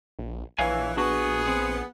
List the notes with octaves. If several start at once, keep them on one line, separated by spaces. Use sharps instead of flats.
A#1
A#1 E3 C#5 F5 G#5
B3 D4 F#4 G#4
C4